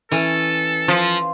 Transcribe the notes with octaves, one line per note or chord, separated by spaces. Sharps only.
E3 C#4 A4
F3